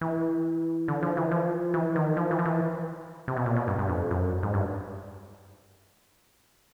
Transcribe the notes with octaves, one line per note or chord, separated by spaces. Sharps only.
E3
D3
F3
E3
F3
E3
D#3
F3
E3
F3
E3
C3
B2
A#2
B2
G2
G2
F2
F#2
G#2
G2